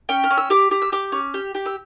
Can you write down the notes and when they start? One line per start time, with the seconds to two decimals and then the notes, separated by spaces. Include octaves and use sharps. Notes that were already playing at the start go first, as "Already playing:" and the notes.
0.09 C#4 G5
0.24 F6
0.30 C#4
0.37 E6
0.50 G4 D6
0.71 G4
0.82 E6
0.92 G4 D6
1.12 C#4
1.34 G4
1.55 G4
1.66 E6